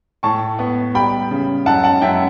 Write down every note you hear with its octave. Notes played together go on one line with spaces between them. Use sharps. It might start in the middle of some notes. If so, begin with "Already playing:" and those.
A2 A5 C#6
B3
G3 G5 B5
C#3
F#2 F#5 A5
F#5 A5
F#2 E5 G5